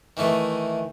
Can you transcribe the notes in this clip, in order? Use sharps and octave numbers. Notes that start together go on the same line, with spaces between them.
D#3 E3 A3 D#4